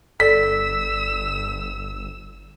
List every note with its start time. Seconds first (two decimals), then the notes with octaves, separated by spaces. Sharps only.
0.20 G1 A4 D5 E6 B6